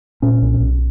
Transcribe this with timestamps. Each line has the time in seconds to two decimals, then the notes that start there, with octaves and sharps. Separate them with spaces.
0.22 A#2 C#4
0.42 B1
0.60 B1